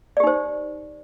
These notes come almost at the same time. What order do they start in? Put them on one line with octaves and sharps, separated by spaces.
D5 G4 D#4 C5